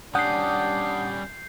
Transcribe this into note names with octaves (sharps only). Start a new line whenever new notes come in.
G3 C#4 D4 F#5 D#6 G6 C7